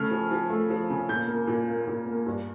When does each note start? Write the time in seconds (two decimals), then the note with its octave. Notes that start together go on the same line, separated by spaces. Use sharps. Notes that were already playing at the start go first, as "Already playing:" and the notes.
Already playing: C#3 A3 F6
0.11 F3
0.31 F3
0.50 A3
0.70 F3
0.90 C#3
1.09 A#2 G6
1.28 A#3
1.47 A#2
1.68 A#3
1.87 A#2
2.06 A#3
2.26 G2